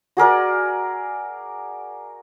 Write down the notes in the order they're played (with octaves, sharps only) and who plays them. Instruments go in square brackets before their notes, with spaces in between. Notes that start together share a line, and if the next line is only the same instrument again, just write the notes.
[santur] F#4 G#4 A#4 D5